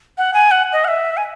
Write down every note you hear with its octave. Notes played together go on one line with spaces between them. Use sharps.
F#5
G#5
F#5
D#5
F#5
E5
G#5